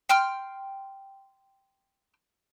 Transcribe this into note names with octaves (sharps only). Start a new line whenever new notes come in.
G5 C6 F6